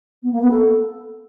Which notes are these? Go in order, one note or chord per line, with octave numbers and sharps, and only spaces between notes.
B3
A#3
B3
A4